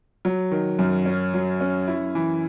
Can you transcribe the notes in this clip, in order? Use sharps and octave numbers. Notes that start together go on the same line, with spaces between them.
F#3
D#3
F#2
C#4
F#3
C#4
E4
E3